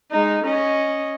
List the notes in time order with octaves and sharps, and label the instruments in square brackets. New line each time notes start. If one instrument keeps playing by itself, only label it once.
[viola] G#3 D#4
C#4 D#5